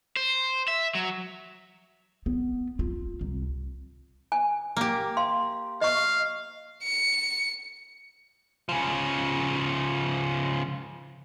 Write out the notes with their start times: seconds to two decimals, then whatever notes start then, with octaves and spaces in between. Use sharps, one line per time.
0.16 C5
0.68 E5
0.95 F#3
2.26 B3
2.79 F4
3.21 C2
4.32 G#5
4.77 A#3 G4
5.17 F5 C6
5.81 D#5 F5 C#6
6.83 C#7
8.69 C#3 F3